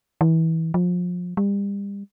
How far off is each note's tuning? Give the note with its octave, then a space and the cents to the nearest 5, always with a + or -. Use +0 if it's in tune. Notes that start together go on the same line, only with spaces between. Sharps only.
E3 -25
F3 +30
G3 +35